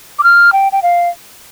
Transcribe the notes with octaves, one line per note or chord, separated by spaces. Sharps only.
D6
F6
G5
G5
F5